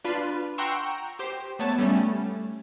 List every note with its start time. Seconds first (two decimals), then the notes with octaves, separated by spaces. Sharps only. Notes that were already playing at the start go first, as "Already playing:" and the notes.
0.04 D4 F4 B4
0.58 F#5 G5 A#5 C6 C#6 E6
1.19 G4 C5
1.59 A3 B3 C#5 A5
1.78 G3 A3 C#4